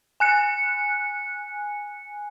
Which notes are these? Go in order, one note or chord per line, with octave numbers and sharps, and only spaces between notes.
G#5 F#6 C#7